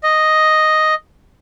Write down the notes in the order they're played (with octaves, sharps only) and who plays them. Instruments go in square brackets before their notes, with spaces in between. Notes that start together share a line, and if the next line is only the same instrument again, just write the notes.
[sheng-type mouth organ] D#5